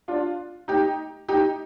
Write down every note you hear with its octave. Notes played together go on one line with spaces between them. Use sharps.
D4 F4
D#4 G4
D#4 G4